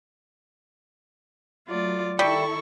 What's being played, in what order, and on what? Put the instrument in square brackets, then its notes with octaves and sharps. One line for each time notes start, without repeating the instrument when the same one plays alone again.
[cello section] F#3 A3 [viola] F4 D5
[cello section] D#3 E4 A4 [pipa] G3 [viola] C#6